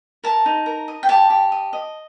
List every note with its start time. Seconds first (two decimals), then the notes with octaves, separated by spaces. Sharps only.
0.24 A#4 A5
0.46 D#4
0.66 A#4
0.88 D#5
1.03 G5
1.09 G4 A5
1.30 G4
1.52 D#5
1.73 D#5